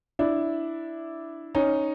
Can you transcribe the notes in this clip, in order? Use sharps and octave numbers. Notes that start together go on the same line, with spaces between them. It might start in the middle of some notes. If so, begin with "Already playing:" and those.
D4 E4
C#4 D#4